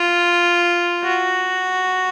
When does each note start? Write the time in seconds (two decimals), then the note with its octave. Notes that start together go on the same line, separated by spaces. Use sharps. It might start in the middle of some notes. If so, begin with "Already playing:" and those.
Already playing: F4
1.04 F#4